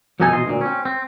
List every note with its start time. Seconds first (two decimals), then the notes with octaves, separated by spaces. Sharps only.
0.20 C2 F2 B2 D#4 A4 G#5
0.33 B2 E3 D#5 C6
0.46 D2 A#2
0.61 C4 C#4
0.85 C4